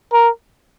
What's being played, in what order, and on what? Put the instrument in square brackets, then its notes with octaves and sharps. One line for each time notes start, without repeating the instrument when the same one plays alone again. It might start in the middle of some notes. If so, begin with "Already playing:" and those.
[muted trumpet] A#4